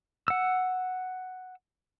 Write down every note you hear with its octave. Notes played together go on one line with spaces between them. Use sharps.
F#5 E6